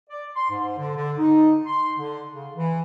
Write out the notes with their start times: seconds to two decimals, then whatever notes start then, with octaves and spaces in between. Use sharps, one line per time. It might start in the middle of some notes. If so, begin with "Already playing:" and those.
0.10 D5
0.36 C6
0.50 G#2
0.77 D3
0.96 D3
1.18 D#4
1.66 C6
1.98 D3
2.33 C#3
2.55 E3